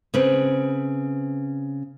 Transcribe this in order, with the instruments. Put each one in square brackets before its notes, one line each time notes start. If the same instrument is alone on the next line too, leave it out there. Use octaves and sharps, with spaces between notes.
[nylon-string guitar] C#3 C4 B4